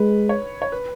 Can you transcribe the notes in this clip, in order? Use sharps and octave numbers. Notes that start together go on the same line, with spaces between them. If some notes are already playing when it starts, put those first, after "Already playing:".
Already playing: G#3 B4
C#5
C#5
B4